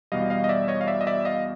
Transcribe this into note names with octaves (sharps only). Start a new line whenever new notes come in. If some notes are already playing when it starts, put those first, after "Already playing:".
E2 B2 G3 D#5 F5
D#5 F5
D#5
D5 E5
C#5 D#5
F5
D5 E5
D#5
D5 E5
D#5 F5